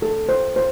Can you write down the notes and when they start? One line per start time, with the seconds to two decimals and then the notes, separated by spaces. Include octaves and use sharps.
0.02 A4
0.29 C5
0.56 C5